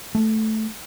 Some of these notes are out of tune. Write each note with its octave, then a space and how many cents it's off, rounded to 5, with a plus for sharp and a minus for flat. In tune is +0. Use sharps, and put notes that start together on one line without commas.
A3 -5